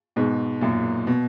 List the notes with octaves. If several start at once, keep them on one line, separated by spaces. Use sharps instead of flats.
G#2 B2
F#2 A#2
B2